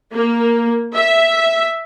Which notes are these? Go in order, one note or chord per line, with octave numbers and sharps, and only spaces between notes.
A#3
E5